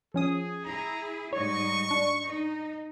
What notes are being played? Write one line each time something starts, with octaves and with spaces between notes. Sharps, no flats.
F3 C#4 G#4 D#6
E4 G#4 A#5
G#2 G3 D#4 C#5 C#6
D4
D#4